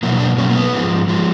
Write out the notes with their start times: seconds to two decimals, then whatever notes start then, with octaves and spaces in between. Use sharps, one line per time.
0.03 B2 F#3 A#3 E4
0.20 D4
0.37 B2 F#3 A#3 C#4
0.50 A#3
0.56 B3
0.73 G#2 F3 G#3
1.08 F3 G#3